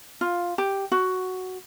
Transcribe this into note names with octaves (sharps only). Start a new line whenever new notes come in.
F4
G4
F#4